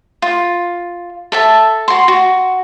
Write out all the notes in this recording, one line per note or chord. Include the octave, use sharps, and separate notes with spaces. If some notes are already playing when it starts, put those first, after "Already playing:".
F4
A4 E5 A5
F#4 C6
F#4